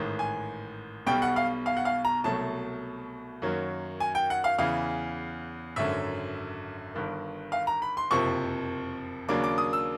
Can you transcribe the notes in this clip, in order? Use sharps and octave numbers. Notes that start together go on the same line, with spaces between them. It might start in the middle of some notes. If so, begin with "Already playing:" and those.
Already playing: A1 G#2 D#3
G#5
B1 B2 G3 G5
F#5
F5
F5
F#5
F5
A#5
C2 B2 F#3 A3 A5
F#2 D#3 F#3 A#3
G#5
G5
F#5
F5
E2 C#3 E3 F5
G#1 F#2 D3 F#3 E5
G1 G2 D#3
F5
A#5
B5
C6
F#1 F2 C3 F3 A#3 C#6
D#2 C#3 F#3 A#3 D4 D6
D6
D#6
E6